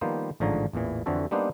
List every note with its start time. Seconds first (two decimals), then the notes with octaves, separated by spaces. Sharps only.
0.01 D#3 F3 G3 A#3 B3 C5
0.40 A1 G#2 D3 F3 C#5 A#5
0.73 A1 E2 A#2 E3
1.06 F2 D3 E3 C4 F#4 A4
1.31 G3 A#3 B3 D4 D#4 C5